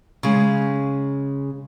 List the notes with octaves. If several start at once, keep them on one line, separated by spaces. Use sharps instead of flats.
C#3 G#3